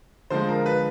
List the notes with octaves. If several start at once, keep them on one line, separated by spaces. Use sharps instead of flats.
D3 F3 G#3 C5
A#4
B4